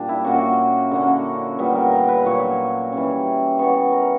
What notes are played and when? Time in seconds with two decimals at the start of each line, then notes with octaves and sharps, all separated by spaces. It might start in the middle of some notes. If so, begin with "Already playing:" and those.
Already playing: A#2 G3 D4
0.09 E4
0.24 A#2 A#3 C#4 F#4
0.91 D3 A#3 C#4
1.59 A#2 G3 B3
1.75 A#4
1.92 A#4
2.09 B4
2.25 A#2 F#3 A#3 C#5
2.92 E3 G3 C#4
3.59 E3 B3 C#5
3.92 A#4